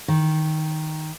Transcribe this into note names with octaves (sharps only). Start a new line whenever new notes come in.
D#3